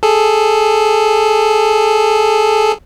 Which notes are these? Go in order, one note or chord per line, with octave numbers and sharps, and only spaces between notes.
G#4 A4